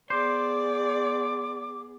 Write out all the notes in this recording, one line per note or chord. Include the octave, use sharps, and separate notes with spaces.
B3 G#4 C5 D5 D6